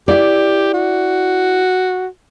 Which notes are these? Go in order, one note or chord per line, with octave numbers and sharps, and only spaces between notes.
E4 G4 D5
F#4